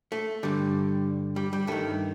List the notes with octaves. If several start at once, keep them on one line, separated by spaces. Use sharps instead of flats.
A3
G2 D3 G3
G3
G3
G2 D#3 A3